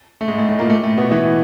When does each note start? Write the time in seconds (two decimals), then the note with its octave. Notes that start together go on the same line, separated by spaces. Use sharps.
0.21 A3
0.28 G#2 G#3
0.38 A2 A3
0.49 A2 A3
0.59 A#2 A#3
0.70 A2 A3
0.83 A2 A3
0.97 B2 B3
1.10 E3 E4